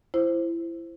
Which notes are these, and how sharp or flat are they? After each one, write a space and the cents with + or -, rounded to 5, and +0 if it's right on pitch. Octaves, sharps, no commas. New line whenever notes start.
E4 +25 C5 +0